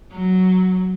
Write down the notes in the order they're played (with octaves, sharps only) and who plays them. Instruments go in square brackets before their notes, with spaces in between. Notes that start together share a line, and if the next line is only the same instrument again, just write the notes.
[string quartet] F#3